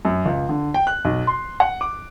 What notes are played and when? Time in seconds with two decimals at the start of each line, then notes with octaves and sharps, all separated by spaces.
0.05 F#2
0.26 C#2
0.49 D3
0.74 G5
0.87 F#6
1.05 B1
1.27 C6
1.60 F#5
1.81 D6